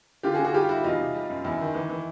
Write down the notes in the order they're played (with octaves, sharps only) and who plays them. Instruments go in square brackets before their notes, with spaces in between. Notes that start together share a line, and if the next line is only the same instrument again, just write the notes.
[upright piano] D3 F4 G4
F#4 G#4
D3
F#4 G#4
G3 F4 G4
G3 E4 F#4
E2 D#4 F4
C3
G3
F#2
E2 E4
D#3
E3
E3